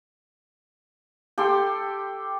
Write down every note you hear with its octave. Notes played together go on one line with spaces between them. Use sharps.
G4 A4 G5 C6